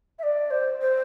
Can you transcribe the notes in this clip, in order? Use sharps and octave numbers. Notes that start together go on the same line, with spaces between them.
E5
D5
C5
C5